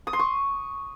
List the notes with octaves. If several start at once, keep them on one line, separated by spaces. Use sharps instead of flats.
D#6
C6
C#6